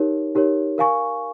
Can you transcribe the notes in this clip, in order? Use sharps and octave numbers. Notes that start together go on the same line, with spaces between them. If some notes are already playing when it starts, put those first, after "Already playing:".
Already playing: D#4 G4 A#4 C#5
D#4 G4 A#4 C#5
A#4 F5 G#5 C#6